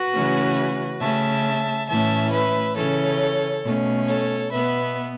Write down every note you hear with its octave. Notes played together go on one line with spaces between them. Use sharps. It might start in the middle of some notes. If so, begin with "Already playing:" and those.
Already playing: F#4 B4
C#3 E3 A3 C#4
C#3 A3 C#4 E5 A5
A2 E3 A3 C#4 E5 A5
B4 E5
C#3 E3 C#4 A4 C#5
B2 A3 C#4
A4 C#5
B2 B3 B4 E5